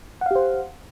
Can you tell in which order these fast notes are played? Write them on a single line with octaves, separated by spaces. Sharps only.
F#5 F5 G4 C5